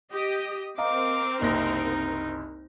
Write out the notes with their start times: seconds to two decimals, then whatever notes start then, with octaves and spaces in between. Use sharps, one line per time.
0.12 G4 D#5
0.78 C4 A#4 D#5 F5 A#5 D6
1.41 F#1 C2 D#4 A#6